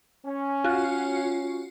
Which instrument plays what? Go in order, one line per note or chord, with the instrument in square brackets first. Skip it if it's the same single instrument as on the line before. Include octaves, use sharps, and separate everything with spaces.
[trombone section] C#4
[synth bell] F4 F#4